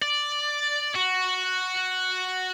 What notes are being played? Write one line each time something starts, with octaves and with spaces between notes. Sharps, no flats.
D5
F#4